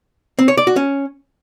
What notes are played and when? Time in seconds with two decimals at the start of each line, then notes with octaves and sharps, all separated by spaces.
0.39 C4
0.48 C#5
0.57 D5
0.67 F#4
0.76 C#4